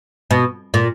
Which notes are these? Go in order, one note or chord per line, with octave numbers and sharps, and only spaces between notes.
B2
A#2